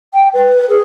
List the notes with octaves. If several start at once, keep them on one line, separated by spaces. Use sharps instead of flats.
G5
B4
G#4